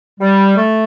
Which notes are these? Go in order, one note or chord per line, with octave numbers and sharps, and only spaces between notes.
G3
A3